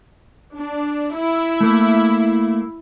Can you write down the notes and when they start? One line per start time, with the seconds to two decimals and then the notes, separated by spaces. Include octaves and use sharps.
0.55 D4
1.15 E4
1.61 A3 A#3